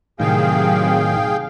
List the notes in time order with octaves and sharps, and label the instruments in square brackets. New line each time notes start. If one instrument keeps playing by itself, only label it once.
[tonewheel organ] A2 D#3 [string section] C3 F#3 [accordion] G#4 F5 G5